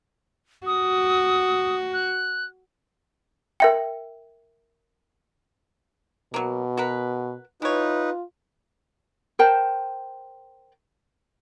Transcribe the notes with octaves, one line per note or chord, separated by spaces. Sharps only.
F#4 D#6
F#6
A#4 E5 G5
B2 F#3 A#3
F#4 A#4 B4
E3 D#4 F4 B4 C#5
A#4 C5 G5 A5